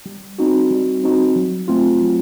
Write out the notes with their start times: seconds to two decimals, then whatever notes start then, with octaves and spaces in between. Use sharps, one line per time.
0.06 G3
0.38 C4 D#4 F#4
0.71 G3
1.04 C4 D#4 F#4
1.36 F#3
1.68 A3 C4 F4
2.01 F#3